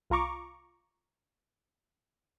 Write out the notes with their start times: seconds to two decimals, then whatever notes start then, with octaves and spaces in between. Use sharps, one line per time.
0.10 C2 F4 A#5 C#6 D6